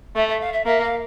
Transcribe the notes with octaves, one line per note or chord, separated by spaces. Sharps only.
A3 E5
E5
F5
E5
A#3 E5
F5